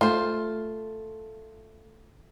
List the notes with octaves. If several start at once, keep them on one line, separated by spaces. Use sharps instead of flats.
A3 F4 C5